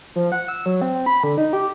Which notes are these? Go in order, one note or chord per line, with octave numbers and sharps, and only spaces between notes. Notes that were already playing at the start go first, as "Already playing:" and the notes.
F3
F#5
E6
F#3
C4
B5
D3
D#4
G4